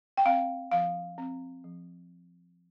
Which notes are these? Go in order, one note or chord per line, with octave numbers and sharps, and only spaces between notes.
G5
C4 F5
F3 F5
C4
F3